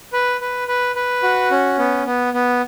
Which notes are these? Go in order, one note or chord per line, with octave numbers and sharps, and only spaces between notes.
B4
B4
B4
B4
F#4
C#4
B3
B3
B3